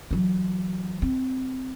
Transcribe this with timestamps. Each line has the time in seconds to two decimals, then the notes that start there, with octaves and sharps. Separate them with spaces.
0.11 E3 F#3
1.02 C4